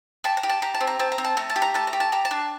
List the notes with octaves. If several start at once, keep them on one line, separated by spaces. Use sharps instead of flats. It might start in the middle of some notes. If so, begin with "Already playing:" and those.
G4 A5
A#5
G4
A5
G4 A#5
A5
C4
A#5
C4 A5
A#5
C4
A5
A3 A#5
A5
G4
A#5
A3 A5
A#5
G4
A5
G4 A#5
A5
D4